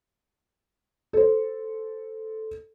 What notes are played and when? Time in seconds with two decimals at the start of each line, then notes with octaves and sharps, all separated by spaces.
1.13 A4 C5